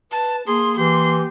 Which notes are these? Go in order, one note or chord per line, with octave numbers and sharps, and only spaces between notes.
B4 A5
A#3 G#4 C6
E3 G4 C6